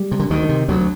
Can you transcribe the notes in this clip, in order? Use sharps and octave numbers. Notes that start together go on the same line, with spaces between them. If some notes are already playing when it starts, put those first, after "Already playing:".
Already playing: G3
C3
D3
D2 D#3
C3
D2 F#3